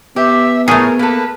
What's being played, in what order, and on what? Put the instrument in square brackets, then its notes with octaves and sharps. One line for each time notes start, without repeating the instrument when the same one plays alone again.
[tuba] B3 [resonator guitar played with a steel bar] G4 [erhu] E5
[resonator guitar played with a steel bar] A2 C#5 [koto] A3 G#4 [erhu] A#4
[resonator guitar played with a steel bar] A#3 A4 [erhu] B4